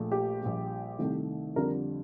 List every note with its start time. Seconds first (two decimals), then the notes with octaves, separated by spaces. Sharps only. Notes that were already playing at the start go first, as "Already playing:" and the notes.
Already playing: A#1 A#2 A3
0.12 G4
0.41 A#1 A#2 G3
0.99 C2 C3 D#3 A3
1.56 F2 D3 G3 A#4